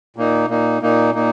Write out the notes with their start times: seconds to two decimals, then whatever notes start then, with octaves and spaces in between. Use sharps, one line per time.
0.16 A#2 A#3 D#4
0.49 A#2 A#3 D#4
0.82 A#2 A#3 D#4
1.15 A#2 A#3 D#4